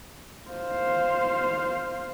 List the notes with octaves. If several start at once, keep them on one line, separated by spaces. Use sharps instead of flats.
C5 F5